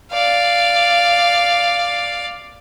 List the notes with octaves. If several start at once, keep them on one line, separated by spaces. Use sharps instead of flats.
D5 F5